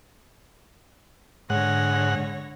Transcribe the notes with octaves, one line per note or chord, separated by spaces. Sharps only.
G#2 D3 C#5 F#5 A#6